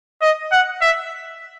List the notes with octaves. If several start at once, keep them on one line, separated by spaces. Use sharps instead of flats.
D#5
F#5
E5